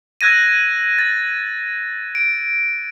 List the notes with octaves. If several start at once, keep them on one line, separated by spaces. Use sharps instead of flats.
E6 F#6 G#6 A#6 D#7
A6
D7